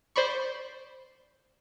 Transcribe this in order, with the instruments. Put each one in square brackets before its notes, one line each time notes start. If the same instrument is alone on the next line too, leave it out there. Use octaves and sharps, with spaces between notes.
[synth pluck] C5 D5 B5 C#6